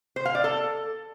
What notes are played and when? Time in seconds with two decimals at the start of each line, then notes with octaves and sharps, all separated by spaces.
0.16 C5
0.25 F5
0.35 D5
0.44 A4